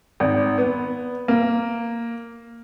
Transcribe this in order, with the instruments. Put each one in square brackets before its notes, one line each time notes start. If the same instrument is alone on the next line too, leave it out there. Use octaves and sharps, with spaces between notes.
[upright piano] G#1
B3
A#3